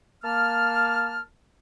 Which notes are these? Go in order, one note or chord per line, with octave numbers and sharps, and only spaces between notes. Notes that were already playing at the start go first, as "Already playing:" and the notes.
A#3 A5 F6